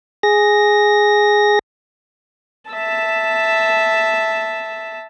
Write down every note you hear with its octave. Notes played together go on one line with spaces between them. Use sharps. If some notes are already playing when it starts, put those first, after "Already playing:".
G#4 A#6
E5 A5